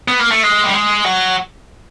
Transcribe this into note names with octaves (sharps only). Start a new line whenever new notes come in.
B3
A#3
A3
G#3
G3
G#3
F#3